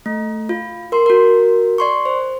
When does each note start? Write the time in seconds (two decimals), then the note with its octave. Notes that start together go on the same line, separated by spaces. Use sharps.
0.06 A3
0.49 F4
0.92 A#4 C6
1.06 F#4 A#4
1.78 D5 C6 C#6
2.06 C5